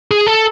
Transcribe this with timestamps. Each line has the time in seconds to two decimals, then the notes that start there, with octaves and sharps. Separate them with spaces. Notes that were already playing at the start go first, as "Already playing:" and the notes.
0.11 G#4
0.27 A4